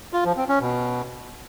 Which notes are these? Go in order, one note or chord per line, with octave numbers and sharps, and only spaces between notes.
F4
F3
C4
C#4
B2